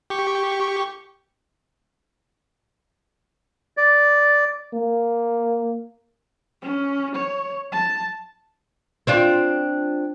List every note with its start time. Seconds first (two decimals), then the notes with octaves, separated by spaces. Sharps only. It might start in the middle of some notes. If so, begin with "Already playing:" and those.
0.10 G4 C#6
3.77 D5
4.74 A#3
6.62 C#4
7.15 C#5
7.72 A5
9.07 C4 D4 F4